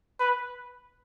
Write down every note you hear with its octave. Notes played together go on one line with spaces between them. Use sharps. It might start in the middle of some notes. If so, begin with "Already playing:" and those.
B4